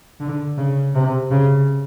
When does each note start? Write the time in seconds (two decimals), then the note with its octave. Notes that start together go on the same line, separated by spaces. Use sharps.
0.20 D3
0.58 C#3
0.95 C3
1.31 C#3